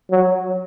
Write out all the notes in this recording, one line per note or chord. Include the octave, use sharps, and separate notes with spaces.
F#3